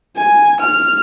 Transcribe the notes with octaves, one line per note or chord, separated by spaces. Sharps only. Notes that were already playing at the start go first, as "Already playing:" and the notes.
G#5
F6